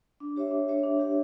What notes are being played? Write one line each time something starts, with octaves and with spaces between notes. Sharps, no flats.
D4
G4 C#5 E5
D4
G4 C#5 E5
D4
G4 C#5 E5